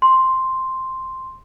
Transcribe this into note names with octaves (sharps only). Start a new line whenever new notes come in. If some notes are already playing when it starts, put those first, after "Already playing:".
C6